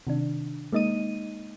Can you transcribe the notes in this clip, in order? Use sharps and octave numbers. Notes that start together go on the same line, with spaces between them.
C3 D#3 D4
G#3 A#3 D#4 D#5 D#7